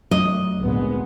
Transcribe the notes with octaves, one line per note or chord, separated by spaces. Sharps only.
F#3 A3 D4 D#5
G#1 D2 A#2 G#3 B3